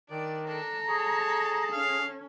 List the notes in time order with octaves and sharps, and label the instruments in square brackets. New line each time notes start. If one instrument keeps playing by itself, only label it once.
[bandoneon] D#3 [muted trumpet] D4 [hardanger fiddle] D5
[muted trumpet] D4 [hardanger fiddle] A4 A5 [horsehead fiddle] A#5
[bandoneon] G#4 [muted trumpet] C#5
[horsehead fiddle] C#4 [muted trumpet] F5